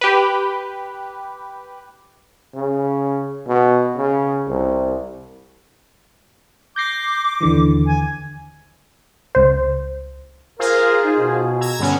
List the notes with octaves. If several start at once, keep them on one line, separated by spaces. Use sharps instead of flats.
G4 B4
C#3
B2
C#3
C2
D6 G6 A#6 C7
D#2 D3 E3
G#5
C#2 C5
F4 G#4 A#4 C5
D#4
B2
A#5 E6 G#6
G2 D3 B3 C#4